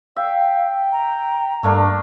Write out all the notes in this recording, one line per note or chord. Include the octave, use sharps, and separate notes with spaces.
E5 F5 G5
A#5
G2 A3 A#3 D4